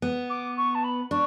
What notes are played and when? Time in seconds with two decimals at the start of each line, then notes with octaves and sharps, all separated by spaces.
0.02 B3
0.30 D6
0.57 C#6
0.75 A5
0.84 B5
1.11 D4 C#6